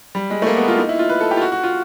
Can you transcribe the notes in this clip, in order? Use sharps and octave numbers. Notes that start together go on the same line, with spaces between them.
G3
G#3
A3
A#3
B3
F4
D#4
E4
F4
B4
A4
G4
F4
F#4
F#4
F4